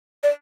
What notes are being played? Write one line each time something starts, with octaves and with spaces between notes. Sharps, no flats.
D5